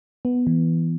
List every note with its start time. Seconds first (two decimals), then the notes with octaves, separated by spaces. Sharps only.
0.25 B3
0.47 E3